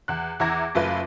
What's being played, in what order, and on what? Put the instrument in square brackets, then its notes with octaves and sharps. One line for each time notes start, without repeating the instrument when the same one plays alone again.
[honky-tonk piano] E2 F#6
E2 E4 A#5 D6 G#6 A#6
F#1 A3 F4 B4